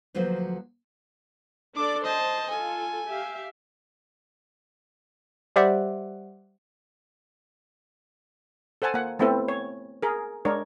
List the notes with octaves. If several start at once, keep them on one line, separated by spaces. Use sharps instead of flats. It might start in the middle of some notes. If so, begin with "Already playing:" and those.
D2 F3 F#3 A#3 B4 C5
D4 A4 D5 D6
C5 D#5 A5
F4 A4 G#5
G4 E5 F5
G3 G4 C5 D5 E5 F#5
A4 C5 F#5 G#5 A5
A#3 F#5
A3 B3 C4 E4 A4 B4
C#5
G#4 A#4
G#3 D4 A#4 C#5